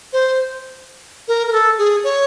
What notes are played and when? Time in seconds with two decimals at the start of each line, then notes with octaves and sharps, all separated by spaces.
0.13 C5
1.28 A#4
1.47 A#4
1.53 A4
1.78 G#4
2.04 C#5